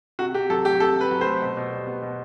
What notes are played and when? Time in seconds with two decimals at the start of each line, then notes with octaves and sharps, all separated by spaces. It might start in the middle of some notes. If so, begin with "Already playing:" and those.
0.19 C3 F#4
0.34 C3 G4
0.50 F#3 A4
0.65 A3 G4
0.80 C3 A4
0.96 C3
1.01 B4
1.11 F#3
1.21 A3 C5
1.41 B2
1.57 B2
1.72 G3
1.87 B3
2.02 B2